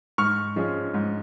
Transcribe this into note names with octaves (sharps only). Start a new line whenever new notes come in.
G#2 C#6 F6
F3 G#3 C#4
G#2